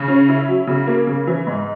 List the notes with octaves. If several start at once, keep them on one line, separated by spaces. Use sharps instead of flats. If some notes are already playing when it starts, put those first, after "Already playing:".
Already playing: C#3
C#4
E4
F#3
C#3
A#3
C#3
E3
G#2